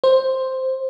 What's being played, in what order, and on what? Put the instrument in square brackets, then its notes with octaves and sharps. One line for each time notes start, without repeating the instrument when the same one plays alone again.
[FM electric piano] C5